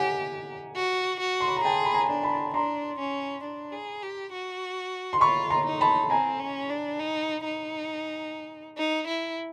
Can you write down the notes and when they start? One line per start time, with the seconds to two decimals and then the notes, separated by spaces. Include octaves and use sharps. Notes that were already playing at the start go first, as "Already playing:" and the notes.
Already playing: G4 F#5 G#5
0.76 F#4
1.20 F#4
1.40 C6
1.48 B5
1.57 A#5
1.64 G#4 G5 A5
1.85 B5
1.94 G#5 A#5
2.10 D4
2.23 A5 B5
2.54 D4 A#5 C6
2.99 C#4
3.44 D4
3.72 G#4
4.02 G4
4.33 F#4
5.13 C6
5.21 F4 B5 C#6
5.50 A#5 C6
5.67 D#4
5.81 A5 B5
6.10 C4 G#5 A#5
6.40 C#4
6.70 D4
7.00 D#4
7.45 D#4
8.78 D#4
9.07 E4